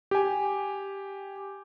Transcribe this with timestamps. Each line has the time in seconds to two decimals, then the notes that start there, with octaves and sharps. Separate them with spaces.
0.11 G4 G#5